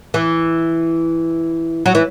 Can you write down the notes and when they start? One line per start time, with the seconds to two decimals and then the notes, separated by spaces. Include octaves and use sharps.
0.14 E3
1.86 F#3
1.95 E3